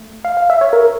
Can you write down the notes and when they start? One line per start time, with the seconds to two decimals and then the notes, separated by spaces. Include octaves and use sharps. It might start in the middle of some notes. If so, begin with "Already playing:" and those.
Already playing: A3
0.25 F5
0.37 F5
0.50 E5
0.61 C#5
0.73 A#4